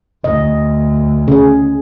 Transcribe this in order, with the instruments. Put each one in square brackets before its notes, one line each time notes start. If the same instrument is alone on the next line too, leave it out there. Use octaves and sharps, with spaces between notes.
[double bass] D2 [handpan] D#5
[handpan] C#3 G#4